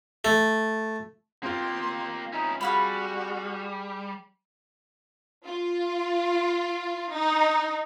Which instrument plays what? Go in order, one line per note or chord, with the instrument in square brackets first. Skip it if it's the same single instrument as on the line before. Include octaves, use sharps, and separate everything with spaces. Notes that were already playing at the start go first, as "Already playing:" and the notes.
[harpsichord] A3
[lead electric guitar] A#3 G4 [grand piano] C4 F4 [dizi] C6
[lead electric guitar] C#4 E4 [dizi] D#4
[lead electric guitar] G3 [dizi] F#4 [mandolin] G#4 F5 B5
[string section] F4
D#4